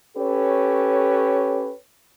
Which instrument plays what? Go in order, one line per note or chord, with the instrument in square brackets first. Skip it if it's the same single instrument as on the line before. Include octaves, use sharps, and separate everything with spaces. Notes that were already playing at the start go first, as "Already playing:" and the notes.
[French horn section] C#4 G4 A4 B4 C#5